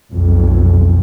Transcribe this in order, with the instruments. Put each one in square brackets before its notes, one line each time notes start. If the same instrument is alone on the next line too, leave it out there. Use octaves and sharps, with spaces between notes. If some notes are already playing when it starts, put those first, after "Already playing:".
[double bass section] B1 F2